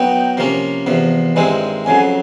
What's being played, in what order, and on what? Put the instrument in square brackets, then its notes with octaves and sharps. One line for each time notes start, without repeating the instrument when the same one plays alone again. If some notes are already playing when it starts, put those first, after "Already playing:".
Already playing: [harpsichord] F#3 B3 D#4 [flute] G5
[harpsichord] C3 F3 A#3 C#4
E2 C3 F3
[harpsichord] G2 D#3 G#3 C4 E4 [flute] G#5
[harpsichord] F2 C#3 F#3 [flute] G#5